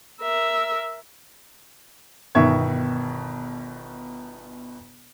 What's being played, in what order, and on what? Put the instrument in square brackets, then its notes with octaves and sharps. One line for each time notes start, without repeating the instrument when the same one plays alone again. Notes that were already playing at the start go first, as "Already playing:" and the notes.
[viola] A#4 E5
[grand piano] G1 B2 D#3 E5 C#6 G#6